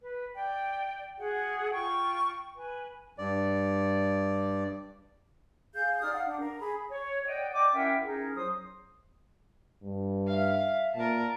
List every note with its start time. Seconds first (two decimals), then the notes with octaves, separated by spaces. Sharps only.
0.02 B4
0.35 D5 G5
1.19 F#4 G#4 F#5
1.72 F4 G5 C#6
2.56 B4 G#5
3.18 G2 D5
5.74 G#4 F5 G6
6.01 D#4 D5 D#6 F6
6.13 F5 F#5
6.25 D4
6.40 A#4
6.60 G#4 B5
6.91 C#5
7.27 D5 D#5 F#5 G5
7.54 D5 D#5 G5 D6
7.74 C#4 E4 A#4 E5 F#5 G5
8.05 C#4 D#4 E4 G#4 A#4
8.36 F#3 C5 C6 D#6
9.83 G2
10.27 E5 F5
10.95 A#2 A#4 A5